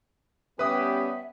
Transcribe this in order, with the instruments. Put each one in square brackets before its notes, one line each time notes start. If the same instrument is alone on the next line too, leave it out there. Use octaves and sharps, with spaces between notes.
[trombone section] G3 C#4 G4 [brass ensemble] B3 [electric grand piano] B4 D#6 [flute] E5